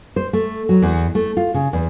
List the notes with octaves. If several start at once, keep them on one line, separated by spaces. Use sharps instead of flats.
C5
A3
F#3
E2
A3
F4
C#3
E2